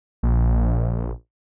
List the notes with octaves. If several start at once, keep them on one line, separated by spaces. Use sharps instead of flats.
A#1